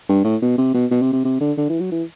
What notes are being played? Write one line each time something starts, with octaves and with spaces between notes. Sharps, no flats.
G2
A2
B2
C3
B2
B2
C3
C3
C3
D3
D3
E3
F#3
E3